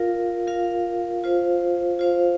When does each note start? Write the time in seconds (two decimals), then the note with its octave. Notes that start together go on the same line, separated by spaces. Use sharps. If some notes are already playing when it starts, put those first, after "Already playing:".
Already playing: F4 A#4 F5
0.47 F4 A#4 F5
1.24 F4 C5 F5
1.99 F4 C5 F5